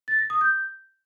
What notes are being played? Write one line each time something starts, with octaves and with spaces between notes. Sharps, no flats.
A6
A#6
D#6
G6